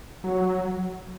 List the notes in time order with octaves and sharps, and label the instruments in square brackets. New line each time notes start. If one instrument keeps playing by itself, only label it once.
[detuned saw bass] F#3